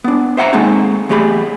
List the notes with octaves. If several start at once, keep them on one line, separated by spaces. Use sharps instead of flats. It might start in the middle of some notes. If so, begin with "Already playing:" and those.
B3 D4
C5 E5 F#5 G5 A#5
G#3 A#3 C4 D#4 G#4 A4
E2 A3 G4 G#4 B5